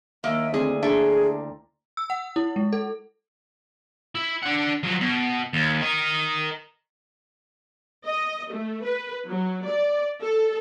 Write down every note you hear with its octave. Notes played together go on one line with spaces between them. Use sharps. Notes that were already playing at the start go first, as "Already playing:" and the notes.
D#2 A#3 D#5 E5 D#6
D2 C4 E4 G#4 A4
D4 G#4 A4 E5 G5 A#5 C6
E6
F#5
E4
G#3
A4
E4
D4 F#5
F3 F#3
B2
D#2
A#4 D#5
D#5
A3
B4
F#3
D5
A4